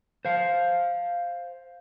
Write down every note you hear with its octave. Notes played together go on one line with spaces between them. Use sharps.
C5 F5